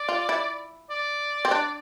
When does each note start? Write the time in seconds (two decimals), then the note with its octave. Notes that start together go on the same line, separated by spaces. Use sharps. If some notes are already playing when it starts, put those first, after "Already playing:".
Already playing: D5
0.09 F4
0.29 E4
0.90 D5
1.45 C4
1.51 D4